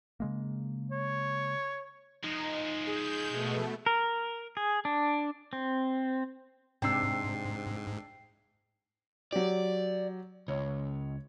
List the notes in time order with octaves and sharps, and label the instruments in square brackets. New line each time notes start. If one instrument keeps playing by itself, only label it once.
[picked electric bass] C#3 G#3 A#3
[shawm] C#5
[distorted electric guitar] F3 G#3 [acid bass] D#4
[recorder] G#4 [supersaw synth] G6
[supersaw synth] B2 A3
[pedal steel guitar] A#4
G#4
D4
C4
[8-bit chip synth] G#2 [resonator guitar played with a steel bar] C3 [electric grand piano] D4 E6 [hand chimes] G5 C7
[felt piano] F#3 G4 [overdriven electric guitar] D5
[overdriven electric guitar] C#2 [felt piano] C#5